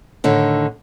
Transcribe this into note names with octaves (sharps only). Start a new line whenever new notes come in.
A2 D3 D#3